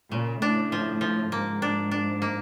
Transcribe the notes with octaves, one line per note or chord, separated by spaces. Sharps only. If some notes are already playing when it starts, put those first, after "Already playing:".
A#2 C#3
A2 D4
F3
F3
G#2 A#3
D4
D4
A#3